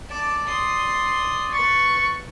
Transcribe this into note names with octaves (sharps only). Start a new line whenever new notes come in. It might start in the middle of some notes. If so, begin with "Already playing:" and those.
D5 A5 D6
C6 D#6
B4 C#6 A6